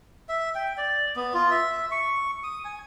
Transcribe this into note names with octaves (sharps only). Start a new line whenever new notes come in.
E5
G5
D5
B3
F4
E5
C#6
D#6
G#5